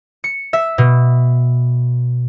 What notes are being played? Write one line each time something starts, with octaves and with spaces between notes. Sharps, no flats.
C#7
E5
B2